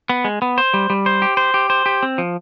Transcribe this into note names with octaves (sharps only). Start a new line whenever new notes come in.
B3
G#3
B3
C5
G3
G3
C5
G4
C5
G4
C5
G4
C4
F3